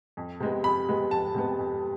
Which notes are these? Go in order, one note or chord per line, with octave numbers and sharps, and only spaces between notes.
F2
C3 G#3 B3
F2 B5
C3 G#3 B3
F2 A5
C3 G#3 B3
F2